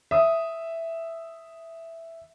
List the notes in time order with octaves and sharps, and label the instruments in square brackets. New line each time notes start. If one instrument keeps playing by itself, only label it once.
[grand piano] E5 D#6